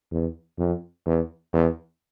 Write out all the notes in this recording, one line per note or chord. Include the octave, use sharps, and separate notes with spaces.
E2
F2
E2
E2